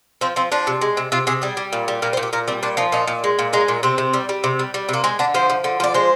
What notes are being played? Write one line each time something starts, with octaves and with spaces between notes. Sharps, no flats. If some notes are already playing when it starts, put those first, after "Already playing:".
F3 C4
F3 C4
F3 D4
C3
G#3
C3
C3 F4
C3 G#4
G3 G#4
G3
A#2
G3
A#2 A#4
C5
A#2
G4
A#2 A#4
G3 C4
A#2 D4
F3 D#4
A#2 D#4
A#2
G#3
A#2
G#3 D#4
A#2
C3 C4
C3
G3
G3
C3
G3
G3
C3 A#3
G#3 C4
D3 D4
F3 C5
F3
D3
F3 D5
G#3 C5